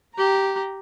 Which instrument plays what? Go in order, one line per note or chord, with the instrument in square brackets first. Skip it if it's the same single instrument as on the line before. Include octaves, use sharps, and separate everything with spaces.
[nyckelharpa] G4 A#5